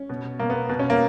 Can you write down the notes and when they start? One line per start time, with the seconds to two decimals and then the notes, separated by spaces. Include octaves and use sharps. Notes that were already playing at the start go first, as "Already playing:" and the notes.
Already playing: C#4
0.09 B2
0.39 B2 A#3
0.50 B3
0.69 B2
0.79 C#4
0.90 A#3